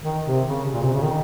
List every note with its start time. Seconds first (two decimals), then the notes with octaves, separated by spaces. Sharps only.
0.03 D#3
0.26 C3
0.47 C#3
0.73 A#2
0.84 C3
0.93 C#3
1.03 D#3